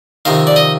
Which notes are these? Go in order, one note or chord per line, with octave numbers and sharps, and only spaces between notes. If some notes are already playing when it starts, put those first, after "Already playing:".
F2 C3 D#3 F5
D5
D#5